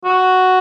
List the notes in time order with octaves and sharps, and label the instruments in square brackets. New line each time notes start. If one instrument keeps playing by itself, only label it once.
[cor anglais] F#4